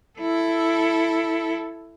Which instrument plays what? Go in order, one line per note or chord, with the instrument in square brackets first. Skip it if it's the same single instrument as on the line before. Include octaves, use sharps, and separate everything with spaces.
[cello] E4 A4